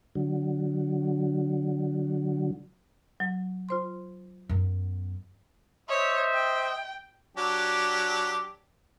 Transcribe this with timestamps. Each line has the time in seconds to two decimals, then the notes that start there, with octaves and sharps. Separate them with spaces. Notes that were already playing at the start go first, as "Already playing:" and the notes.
0.15 D3 F#3
3.20 F#3
3.69 F4 C5 C6
4.49 F#2 B3
5.89 C5 C#5 D#5 E5
6.34 G5
7.37 F#3 D4 G4